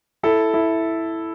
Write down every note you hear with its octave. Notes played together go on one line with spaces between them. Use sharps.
E4 A4
E4